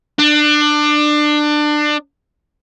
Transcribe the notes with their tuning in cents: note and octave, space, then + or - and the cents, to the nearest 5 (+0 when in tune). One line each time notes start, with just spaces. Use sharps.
D4 +25